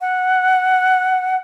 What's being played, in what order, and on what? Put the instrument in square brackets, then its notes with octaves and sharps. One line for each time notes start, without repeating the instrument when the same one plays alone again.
[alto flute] F#5